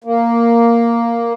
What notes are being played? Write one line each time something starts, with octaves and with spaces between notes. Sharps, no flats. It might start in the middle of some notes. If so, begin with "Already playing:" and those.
A#3